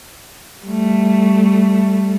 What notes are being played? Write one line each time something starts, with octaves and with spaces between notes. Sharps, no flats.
G3 A3